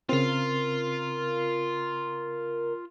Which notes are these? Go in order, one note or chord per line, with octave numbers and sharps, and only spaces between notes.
C#3 C4 F4 A#4 F5